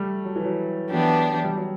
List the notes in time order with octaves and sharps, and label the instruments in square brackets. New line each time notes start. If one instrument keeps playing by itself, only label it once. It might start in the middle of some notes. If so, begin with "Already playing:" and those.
Already playing: [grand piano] G3 A3
F#3
E3
F#3
[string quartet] E3 B3 D4 G4 [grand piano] F#3
[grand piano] G3
F#3